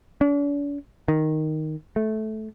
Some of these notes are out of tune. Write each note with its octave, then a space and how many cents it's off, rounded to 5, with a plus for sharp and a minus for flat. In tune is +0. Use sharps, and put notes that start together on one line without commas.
D4 -45
D#3 +0
A3 -15